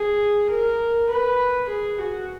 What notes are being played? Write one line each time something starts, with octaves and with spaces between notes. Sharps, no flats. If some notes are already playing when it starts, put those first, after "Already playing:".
Already playing: G#4
A#4
B4
G#4
F#4